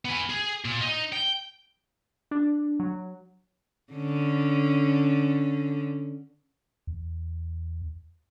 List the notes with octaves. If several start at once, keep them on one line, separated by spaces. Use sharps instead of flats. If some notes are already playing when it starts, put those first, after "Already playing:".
B3 G#5
G#4
A#2
D#4
G5
D4
F#3
D3 C#4
E2